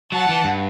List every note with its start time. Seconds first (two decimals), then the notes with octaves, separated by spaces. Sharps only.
0.12 F#3 F#5 A5
0.29 E3
0.44 G2